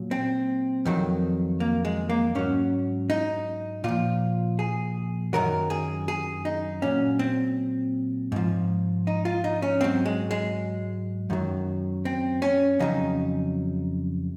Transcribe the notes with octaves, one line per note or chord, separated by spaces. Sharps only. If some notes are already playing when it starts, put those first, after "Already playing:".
Already playing: A#2 F#3
C4
F2 D#3 F#3
A#3
G#3
A#3
G#2 F#3 C#4
D#4
A#2 F3 F4
G#4
F#2 D#3 F#3 A#4
G#4
G#4
D#4
A#2 F#3 C#4
C4
G#2 F3
D#4
F4
D#4
C#4
G#2 F#3 C4
G#3
G#3
F#2 D#3 F#3
C4
C#4
F2 C#3 F#3 D#4